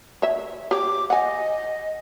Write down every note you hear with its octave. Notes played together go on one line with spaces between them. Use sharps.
C#5 E5
G4 C#5 D6
D#5 F#5 G#5